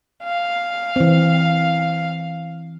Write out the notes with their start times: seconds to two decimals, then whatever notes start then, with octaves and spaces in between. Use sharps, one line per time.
0.24 F5
0.96 E3 C4